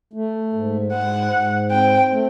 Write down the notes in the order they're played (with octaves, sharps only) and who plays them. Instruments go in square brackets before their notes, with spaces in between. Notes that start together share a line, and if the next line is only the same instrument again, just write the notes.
[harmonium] A3
G#2
[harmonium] G#2 [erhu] F#5
[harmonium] G#2
[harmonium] C4 [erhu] G5
[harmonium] A3